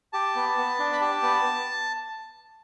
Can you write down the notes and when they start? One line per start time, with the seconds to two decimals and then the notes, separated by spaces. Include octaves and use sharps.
0.13 G4 A5
0.36 B3
0.58 B3
0.79 D4
0.93 B5
1.01 G4 A5
1.23 B3